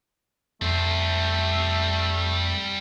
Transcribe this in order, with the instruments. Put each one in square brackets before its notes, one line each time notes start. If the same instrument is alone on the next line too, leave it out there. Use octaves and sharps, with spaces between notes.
[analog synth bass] F2 [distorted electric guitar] G3 C5 [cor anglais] A3